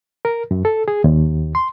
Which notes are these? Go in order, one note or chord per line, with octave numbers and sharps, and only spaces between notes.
A#4
F#2
A4
G#4
D#2
C6